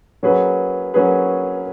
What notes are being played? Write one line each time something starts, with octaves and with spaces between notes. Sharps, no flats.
F#3 A#3 C#4 G#4 B4
F#3 A#3 C#4 G#4 B4